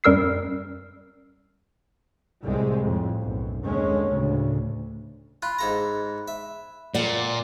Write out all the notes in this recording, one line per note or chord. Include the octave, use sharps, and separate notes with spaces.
F#2 G3 A#4 E6 C7
C2 A2 G3 G#3 C4
F2 A2
B1 F#2
D#2 D3 G#3 C#4
D2 A2 C#3
F4 B5 F#6
G#2 A4 A#5
E5
A#2 D5 F#5